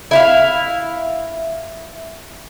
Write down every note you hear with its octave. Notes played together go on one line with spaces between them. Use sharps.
E4 E5 F5